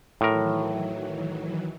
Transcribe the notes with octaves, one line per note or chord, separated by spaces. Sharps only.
A2 D#3 E3 F#3 A#4